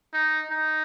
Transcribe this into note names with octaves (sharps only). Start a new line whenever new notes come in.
D#4
D#4